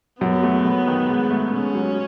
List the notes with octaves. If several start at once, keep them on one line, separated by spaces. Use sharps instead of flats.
F#2 B3
A3
F#2
D#3
G#2
A3
G#2 C#4
F#3